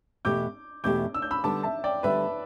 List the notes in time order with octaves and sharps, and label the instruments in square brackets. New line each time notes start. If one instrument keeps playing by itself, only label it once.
[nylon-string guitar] E2 B2 A3 G4 [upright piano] D6 G6
[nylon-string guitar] E2 B2 A3 G4 [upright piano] D6 G6
[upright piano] E6
G6
B5 E6
[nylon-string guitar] D3 G3 B3 [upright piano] A5 D6
[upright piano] E5 A5
D5 G5
[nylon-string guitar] D3 G3 B3 [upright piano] B4 E5